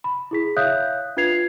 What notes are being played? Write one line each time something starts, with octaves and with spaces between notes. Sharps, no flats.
B5
E4 G#4 B6
C#5 E5 F5 D#6 F#6 G6
D4 F4 B4 G#6 C7 F7